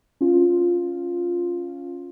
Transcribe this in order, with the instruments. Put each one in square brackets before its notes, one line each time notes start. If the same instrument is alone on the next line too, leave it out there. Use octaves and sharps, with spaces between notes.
[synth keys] C#4 F4